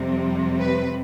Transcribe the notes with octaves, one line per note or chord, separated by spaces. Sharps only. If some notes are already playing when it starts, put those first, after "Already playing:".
Already playing: F2 C3 G3 C4
B4